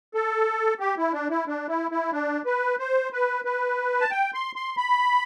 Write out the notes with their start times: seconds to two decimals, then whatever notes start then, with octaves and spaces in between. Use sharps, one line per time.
0.14 A4
0.80 G4
0.98 E4
1.13 D4
1.30 E4
1.47 D4
1.68 E4
1.91 E4
2.12 D4
2.46 B4
2.79 C5
3.13 B4
3.45 B4
4.01 A5
4.11 G5
4.34 C6
4.56 C6
4.77 B5